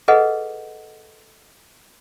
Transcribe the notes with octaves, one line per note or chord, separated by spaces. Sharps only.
G#4 A4 B4 D#5 F#5